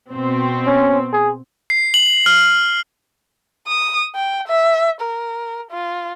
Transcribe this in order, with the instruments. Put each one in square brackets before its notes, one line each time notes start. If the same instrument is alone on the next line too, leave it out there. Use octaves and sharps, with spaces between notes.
[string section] B2 C4
[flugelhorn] C#4
G#4
[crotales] C7
F#7
F6
[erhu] D#6
G5
E5
A#4
F4